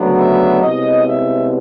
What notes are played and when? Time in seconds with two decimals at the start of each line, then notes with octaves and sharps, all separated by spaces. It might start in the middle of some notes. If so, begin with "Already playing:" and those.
Already playing: D2 C#3 F#3 B3 D4
0.17 E5
0.62 C2 B2 G#3 C#4 D#5
1.07 E5